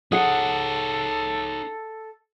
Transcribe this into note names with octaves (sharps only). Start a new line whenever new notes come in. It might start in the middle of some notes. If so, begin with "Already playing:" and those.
D#4 G#4 A4 C#5 F#5